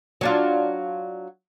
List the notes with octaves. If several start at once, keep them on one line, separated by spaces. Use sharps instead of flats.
F#3 D4 F4